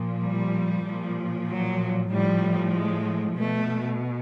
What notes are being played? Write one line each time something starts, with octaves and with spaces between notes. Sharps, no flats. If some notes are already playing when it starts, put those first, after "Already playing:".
Already playing: A#2 F3
G3
A#2 F3
F#3
A2 F3 G3
G#3
B2 A3